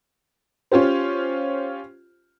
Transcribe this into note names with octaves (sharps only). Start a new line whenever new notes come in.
C#4 F4 G4 C5